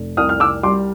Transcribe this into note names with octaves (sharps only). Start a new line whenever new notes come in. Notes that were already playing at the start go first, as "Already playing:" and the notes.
Already playing: F1
C2 D#6 F6
F6
D6 E6
G3 C6 D6